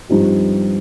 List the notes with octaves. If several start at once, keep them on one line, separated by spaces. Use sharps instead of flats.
G2 F3 C4 D#4 G4